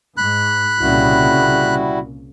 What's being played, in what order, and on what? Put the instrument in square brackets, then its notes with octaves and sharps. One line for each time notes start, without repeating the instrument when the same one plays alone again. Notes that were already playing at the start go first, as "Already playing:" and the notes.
[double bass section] G#2 [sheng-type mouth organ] B5 F#6
[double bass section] C2 A#2 C#3 [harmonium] G3 E4 F#4